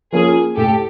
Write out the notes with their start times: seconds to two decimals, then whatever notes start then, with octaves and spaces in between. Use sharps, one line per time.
0.12 F3 A#3 C#4 F4 G#4
0.56 A2 G4 A4